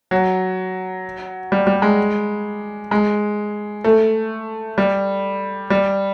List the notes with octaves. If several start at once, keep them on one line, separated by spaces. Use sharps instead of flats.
F#3
G3
G3
G#3
G#3
A3
G3
G3